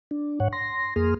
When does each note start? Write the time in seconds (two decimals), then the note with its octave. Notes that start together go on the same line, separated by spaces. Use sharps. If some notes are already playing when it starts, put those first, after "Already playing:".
0.11 D4
0.40 G#2 C#5 F#5
0.53 C6 A#6
0.96 F2 A#3 G#4 C6 D#6 F6